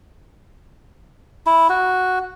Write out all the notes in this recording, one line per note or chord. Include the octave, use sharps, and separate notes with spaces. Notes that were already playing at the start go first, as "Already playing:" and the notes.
E4
F#4